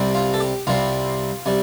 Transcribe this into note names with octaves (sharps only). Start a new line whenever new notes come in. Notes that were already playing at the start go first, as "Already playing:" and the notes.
Already playing: C2 C3 G3 C4
F4
A4
G4
C2 C3 G3 C4 F4
C3 G3